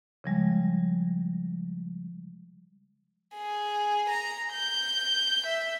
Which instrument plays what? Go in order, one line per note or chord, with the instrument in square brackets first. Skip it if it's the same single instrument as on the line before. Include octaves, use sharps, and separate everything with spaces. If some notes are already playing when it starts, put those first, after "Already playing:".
[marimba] C#3 F3 G3 G#3
[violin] G#4
A#5
G6
E5